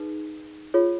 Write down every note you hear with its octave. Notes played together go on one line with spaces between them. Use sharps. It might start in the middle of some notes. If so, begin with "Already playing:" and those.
Already playing: D#4 G#4 B4
F4 G#4 C#5